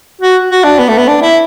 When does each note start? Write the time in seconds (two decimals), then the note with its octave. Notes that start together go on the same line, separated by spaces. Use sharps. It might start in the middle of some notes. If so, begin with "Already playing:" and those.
0.22 F#4
0.51 F#4
0.64 D4
0.79 B3
0.88 A3
0.98 B3
1.08 D4
1.22 E4